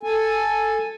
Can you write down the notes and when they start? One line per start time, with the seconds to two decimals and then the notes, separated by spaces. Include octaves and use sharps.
0.03 A4 G#5